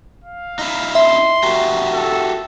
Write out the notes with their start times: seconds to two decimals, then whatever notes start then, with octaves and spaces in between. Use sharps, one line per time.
0.24 F5
0.59 D#4 E4
0.95 E5 C6
1.43 F#4 G4 A#4
1.94 A4